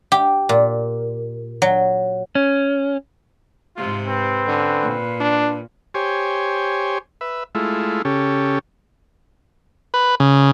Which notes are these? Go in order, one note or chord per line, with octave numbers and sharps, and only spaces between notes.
G4
A#2
F#3
C#4
G#2 C3 F4
C4 B4
D3 C#4
A#2
D4
G4 C5 C#5 G#5
B4 E5
G#3 A3 E4 F4
C#3 C#4 G4 A4
B4
C#3